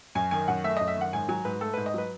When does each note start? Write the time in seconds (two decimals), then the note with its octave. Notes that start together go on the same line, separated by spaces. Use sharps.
0.15 F#2 G#5
0.31 D#3 G#5
0.48 F#2 F#5
0.64 A3 E5
0.77 F#2 D#5
0.88 E5
0.96 D#3 F#5
1.13 G#2 G#5
1.29 F#3 G#5
1.45 G#2 B4
1.61 A3 A4
1.74 G#2 B4
1.86 D#5
1.94 F#3 B4